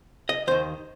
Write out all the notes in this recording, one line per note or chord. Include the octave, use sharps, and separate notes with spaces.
D#5
D#2 D#3 C5